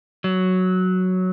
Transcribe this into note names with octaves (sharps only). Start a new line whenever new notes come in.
F#3